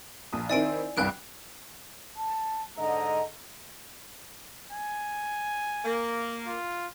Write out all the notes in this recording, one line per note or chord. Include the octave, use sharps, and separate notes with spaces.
A#1 D#6
D#3 C4 E4 D5 G#5 D7
G1 C2 G2 G5 F#6 D7
A5
G#2 D3 D#5 A#5
G#5
A#3
F4